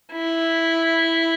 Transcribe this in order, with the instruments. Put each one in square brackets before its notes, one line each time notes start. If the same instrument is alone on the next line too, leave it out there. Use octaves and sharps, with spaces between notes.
[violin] E4